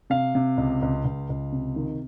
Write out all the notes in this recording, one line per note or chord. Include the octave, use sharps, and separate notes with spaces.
C3 F5
C3
C#2
C#2
C#2
C#2
C3
D#3